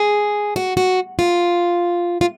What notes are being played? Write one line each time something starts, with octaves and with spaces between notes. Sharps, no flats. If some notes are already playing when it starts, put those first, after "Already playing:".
Already playing: G#4
F#4
F#4
F4
F4